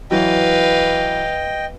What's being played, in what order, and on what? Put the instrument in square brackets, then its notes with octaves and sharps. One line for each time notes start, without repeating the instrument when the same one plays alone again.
[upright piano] E3 F#3 [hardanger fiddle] B4 F5 [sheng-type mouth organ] D#5 G5